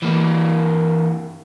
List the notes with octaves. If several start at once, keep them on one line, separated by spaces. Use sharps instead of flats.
E3 A#3